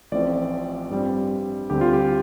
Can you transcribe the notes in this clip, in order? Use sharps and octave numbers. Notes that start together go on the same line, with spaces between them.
A1 A2 F3 C4 D5
G2 G3 C4
D2 D3 G3 C4 G4
F4
G4